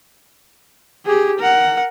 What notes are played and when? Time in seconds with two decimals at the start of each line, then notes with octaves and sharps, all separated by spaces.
1.06 G4 G#4
1.39 A#4 F#5